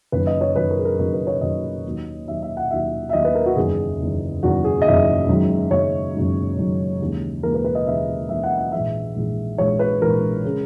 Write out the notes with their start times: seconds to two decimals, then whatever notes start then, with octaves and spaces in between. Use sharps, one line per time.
0.12 F#1 F#2 D#3 F#3 B4
0.27 D#5
0.41 C#5
0.56 F#1 F#2 D#3 F#3 B4
0.71 A#4
0.79 G#4
0.85 A#4
0.98 F#1 F#2 D#3 F#3 A#4
1.13 B4
1.27 C#5
1.41 F#1 F#2 D#3 F#3 D#5
1.85 D#2 D#3 F#3
2.27 D#2 D#3 F#3 E5
2.42 E5
2.57 F#5
2.71 D#2 D#3 F#3 E5
3.09 E5
3.13 D#2 D#3 F#3 D#5
3.25 B4
3.35 A#4
3.46 F#4
3.56 F#1 E2 D#3 G#4
4.00 F#1 E2 D#3
4.43 F#1 E2 D#3 F#4
4.64 G#4
4.82 D#5
4.85 F#1 E2 D#3 E5
5.28 F#1 F#2 D#3 G#3
5.71 F#1 F#2 D#3 G#3 C#5
6.14 F#1 F#2 D#3 G#3
6.58 F#1 F#2 D#3 G#3
7.01 D#2 C#3 E3 G#3
7.43 D#2 C#3 E3 G#3 A#4
7.54 B4
7.64 B4
7.75 D#5
7.87 D#2 C#3 E3 G#3 E5
8.29 D#2 C#3 E3 G#3 E5
8.43 F#5
8.58 F#5
8.72 A#1 G#2 E3 G#3 E5
9.16 A#1 G#2 E3 G#3
9.58 A#1 G#2 E3 G#3 C#5
9.79 B4
10.02 A#1 G#2 E3 G#3 A#4
10.45 C#3 G#3